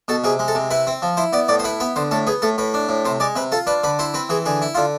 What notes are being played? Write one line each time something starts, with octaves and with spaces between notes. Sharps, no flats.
B2 A4
C3 G#4
G#3
A4
C3
E4 B4
C4
F3
E4 C5
B3 D5
A2 D5
C5
E4 B4
B3 B4
D3 C5
A2 A4
B3 G#4
A2 A4
A2 B4
D4
A2
C3 C5
G#3 D5
C3 B4
F4 A4
D4 B4
D3 B4
E4 C5
C4 B4
E3 G#4
D3 G#4
E4
D3 F4